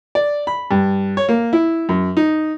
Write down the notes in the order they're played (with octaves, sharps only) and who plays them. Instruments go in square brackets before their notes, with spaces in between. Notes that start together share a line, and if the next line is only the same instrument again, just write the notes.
[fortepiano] D5
B5
G2
C#5
A#3
E4
F#2
D#4